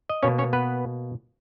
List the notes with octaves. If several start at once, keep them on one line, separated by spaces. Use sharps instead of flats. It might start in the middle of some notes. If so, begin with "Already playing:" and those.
D#5
B2 A#3 C#4 C#5
C#4 C#5
B3 B4